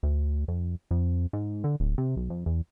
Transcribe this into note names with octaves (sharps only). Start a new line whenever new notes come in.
D2
F2
F2
G#2
D3
D1
C3
B1
F2
E2